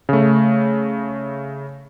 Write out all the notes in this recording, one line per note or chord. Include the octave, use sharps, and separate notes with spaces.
C#3 A3